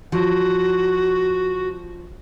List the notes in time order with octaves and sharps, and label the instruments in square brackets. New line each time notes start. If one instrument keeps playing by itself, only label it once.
[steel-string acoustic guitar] F3 [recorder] F#4